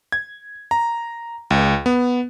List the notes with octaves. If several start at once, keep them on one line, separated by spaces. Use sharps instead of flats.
G#6
A#5
C#2
B3